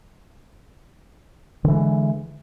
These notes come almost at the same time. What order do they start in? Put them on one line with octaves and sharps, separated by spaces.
D3 E3 G#3